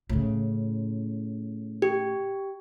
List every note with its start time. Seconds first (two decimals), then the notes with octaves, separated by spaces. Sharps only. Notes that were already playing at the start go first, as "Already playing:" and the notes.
0.09 A2 C#3
1.82 G4